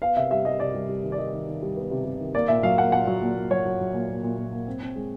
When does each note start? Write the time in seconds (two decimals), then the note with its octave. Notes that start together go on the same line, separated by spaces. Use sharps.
0.02 B3 F5
0.16 C3 E5
0.31 G3 E5
0.45 G3 D#5
0.60 C3 D5
0.74 G3
0.89 G3
1.03 D#3
1.12 D5
1.18 G3 D#5
1.33 D#3
1.47 D#3
1.62 G3
1.77 B3
1.91 C3
2.05 C3
2.20 D#3
2.34 A#3 D5
2.48 A#2 E5
2.63 F#3 F5
2.77 A#3 F#5
2.92 A#2 F#5
3.07 F#3
3.21 A#2
3.35 A#2
3.51 F#3 C#5
3.65 F#3
3.79 F#3
3.93 A#2
4.09 A#2
4.23 A#2
4.37 A#2
4.52 A#3
4.67 C4
4.81 C4
4.96 G#3